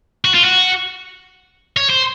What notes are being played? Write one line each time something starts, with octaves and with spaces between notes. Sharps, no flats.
F#4
F4
F#4
C#5
C5